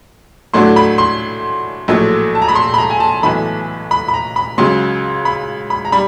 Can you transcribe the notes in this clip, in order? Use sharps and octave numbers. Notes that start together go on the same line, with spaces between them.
A2 F#3 A3 D4 F#4 C6
B5
C6
A#1 A2 F#3 A3
A5
A#5
B5
C6
B5
A#5
G#5
A5
B1 A2 E3 A3 B5
B5
B5
A#5
B5
C#2 C#3 F#3 C6
B5
B5
A#5
G3 B5